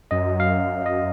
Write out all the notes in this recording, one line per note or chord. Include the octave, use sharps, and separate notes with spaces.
F#2 D#5
F5
D#5